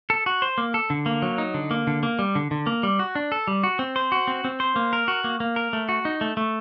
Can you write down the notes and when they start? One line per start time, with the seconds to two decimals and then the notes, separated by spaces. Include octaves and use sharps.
0.10 A4
0.26 F#4
0.42 C5
0.58 A#3
0.74 A4
0.90 D3
1.06 A#3
1.22 F#3
1.38 D#4
1.54 D3
1.71 A#3
1.87 D3
2.03 A#3
2.19 G3
2.35 D3
2.51 D3
2.67 A#3
2.83 G3
2.99 F#4
3.15 D4
3.32 A4
3.47 G3
3.64 F#4
3.79 C4
3.96 C5
4.12 F#4
4.28 C4
4.45 C4
4.60 C5
4.76 A#3
4.93 A#4
5.08 F#4
5.24 A#3
5.40 A#3
5.56 A#4
5.73 A3
5.89 F#4
6.05 D#4
6.21 A3
6.37 A3